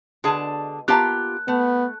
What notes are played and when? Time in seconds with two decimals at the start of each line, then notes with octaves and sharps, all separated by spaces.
0.24 B2 D3 G#3 G#4 A5
0.88 A#3 B3 F4 G4 A5 A#5 F#6
1.48 A3 B3